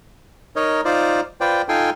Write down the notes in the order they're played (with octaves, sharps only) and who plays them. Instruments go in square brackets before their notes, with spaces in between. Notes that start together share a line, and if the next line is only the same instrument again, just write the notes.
[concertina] D#4 A#4 C#5 D#5
D#4 F4 C5 D5
F4 B4 C5 D5 G5
D#4 F4 A4 G5 G#5 C6